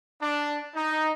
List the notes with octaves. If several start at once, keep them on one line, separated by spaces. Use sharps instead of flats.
D4
D#4